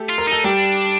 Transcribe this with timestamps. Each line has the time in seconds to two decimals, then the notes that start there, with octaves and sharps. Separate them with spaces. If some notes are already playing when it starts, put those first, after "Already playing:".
Already playing: A3 G4 A4
0.09 F4
0.18 A#4
0.27 D#4
0.32 A4
0.44 G3 D4 G4